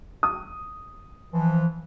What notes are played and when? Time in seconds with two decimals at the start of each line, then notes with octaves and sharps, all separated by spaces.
0.23 D#6
1.33 E3 F3